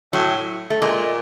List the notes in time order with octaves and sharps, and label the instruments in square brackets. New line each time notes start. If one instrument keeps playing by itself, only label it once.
[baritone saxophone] A2 [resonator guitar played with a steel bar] F#3
[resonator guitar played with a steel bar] A3
[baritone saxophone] A#2 [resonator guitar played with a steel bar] G#3